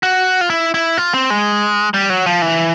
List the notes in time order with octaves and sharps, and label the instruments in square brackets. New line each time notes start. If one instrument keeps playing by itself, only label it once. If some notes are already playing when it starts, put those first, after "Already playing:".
[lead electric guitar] F#4
F4
E4
E4
F4
C4
G#3
G3
F#3
F3
E3